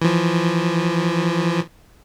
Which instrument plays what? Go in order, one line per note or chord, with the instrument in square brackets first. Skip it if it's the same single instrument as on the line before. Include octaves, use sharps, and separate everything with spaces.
[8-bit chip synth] E3 F3